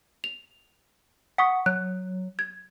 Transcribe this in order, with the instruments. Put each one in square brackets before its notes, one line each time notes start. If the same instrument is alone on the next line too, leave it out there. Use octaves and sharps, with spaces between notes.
[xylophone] F7
[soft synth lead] F#5 [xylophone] C#6 D#6 B6
[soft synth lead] F#3 [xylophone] F#6
[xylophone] G#6